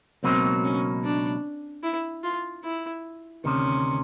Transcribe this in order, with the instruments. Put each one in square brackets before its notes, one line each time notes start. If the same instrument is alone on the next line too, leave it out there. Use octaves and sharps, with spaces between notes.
[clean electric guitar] C#2 B2 F#3 A#3 D#4 [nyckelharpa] C4
[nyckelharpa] C#4
D4
E4
F4
E4
[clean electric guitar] D2 C3 D#3 [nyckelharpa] C#4